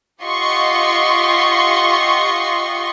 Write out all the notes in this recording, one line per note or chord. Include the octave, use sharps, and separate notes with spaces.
F4 G4 D#5 F#5 C6 C#6